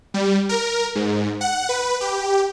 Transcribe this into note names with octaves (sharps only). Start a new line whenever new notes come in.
G3
A#4
G#2
F#5
B4
G4